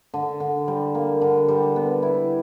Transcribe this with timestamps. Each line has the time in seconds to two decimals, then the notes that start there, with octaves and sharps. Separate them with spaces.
0.14 D3
0.40 D3
0.68 G3
0.95 A#3
1.21 D3
1.48 G3
1.76 B3
2.03 E4